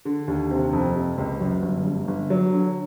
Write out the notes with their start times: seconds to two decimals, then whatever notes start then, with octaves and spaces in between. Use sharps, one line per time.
0.05 D3
0.28 D#2
0.51 C3
0.73 F2
0.95 C3
1.18 C#2
1.40 F#2
1.62 G1
1.85 G2
2.08 G1
2.30 F#3
2.52 D3